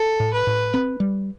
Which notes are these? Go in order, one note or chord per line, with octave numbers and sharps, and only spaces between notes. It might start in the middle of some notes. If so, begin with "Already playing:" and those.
Already playing: A4
A2
B4
A2
C4
G3